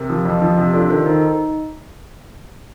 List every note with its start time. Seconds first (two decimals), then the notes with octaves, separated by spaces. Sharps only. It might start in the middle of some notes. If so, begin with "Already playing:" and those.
Already playing: C3 G4 A#4
0.10 F3
0.25 F2
0.42 F3
0.57 C3
0.73 D4 F4 A4
0.90 D#3 A4 C5
1.06 D#3 D#4
1.22 D#4